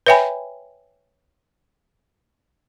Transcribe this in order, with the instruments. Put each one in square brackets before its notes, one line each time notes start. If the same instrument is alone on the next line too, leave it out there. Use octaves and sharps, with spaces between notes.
[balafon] B4 C#5 E5 G5 G#5 B5